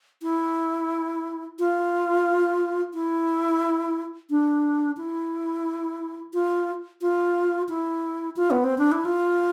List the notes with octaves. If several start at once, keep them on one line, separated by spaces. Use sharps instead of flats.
E4
F4
E4
D4
E4
F4
F4
E4
F4
B3
C4
D4
E4
F4